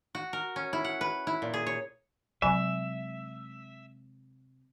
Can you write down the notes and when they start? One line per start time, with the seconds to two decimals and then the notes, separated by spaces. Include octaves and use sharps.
0.15 F#4
0.33 A#4
0.56 C#4
0.73 E4
0.84 F#5
1.01 B4
1.27 E4
1.42 A#2
1.54 G#4
1.67 C#5
2.42 C3 F#3 G#3 E5 G#5 B5